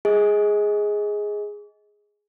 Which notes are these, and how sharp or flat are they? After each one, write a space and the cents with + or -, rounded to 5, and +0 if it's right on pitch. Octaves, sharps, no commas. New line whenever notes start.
G#4 +0 D#5 +25